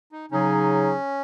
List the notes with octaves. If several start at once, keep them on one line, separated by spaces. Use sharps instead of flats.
D#4
C#3 F#3 C#4 D#4 G#4